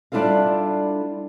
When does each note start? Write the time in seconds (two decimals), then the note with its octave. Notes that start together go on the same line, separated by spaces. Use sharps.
0.12 G3 D4 E4 F4 A4 F5